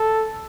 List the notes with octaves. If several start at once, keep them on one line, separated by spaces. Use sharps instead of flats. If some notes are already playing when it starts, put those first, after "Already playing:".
Already playing: A4